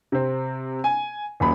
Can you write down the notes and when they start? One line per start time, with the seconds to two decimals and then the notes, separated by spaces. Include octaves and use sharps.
0.12 C3 C4
0.84 G#5
1.40 D#1 F#2 B5